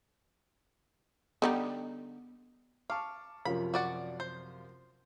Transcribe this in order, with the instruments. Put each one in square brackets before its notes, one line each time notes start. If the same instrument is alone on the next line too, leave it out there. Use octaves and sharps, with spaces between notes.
[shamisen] D3 G3 D#4 [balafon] B3
[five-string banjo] F5 [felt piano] A5 C#6 F6 [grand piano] D6
[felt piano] F#2 C#5 F5 [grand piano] C3 F3 A#4 [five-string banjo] B5
[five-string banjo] F#4 D5 F#5
C5